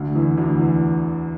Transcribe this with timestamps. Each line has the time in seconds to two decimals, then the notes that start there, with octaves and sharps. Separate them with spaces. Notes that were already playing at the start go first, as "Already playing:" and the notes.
Already playing: D2 D3
0.15 E2 E3
0.37 D2 D3
0.59 E2 E3